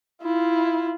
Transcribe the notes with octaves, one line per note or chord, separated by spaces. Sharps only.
E4 F4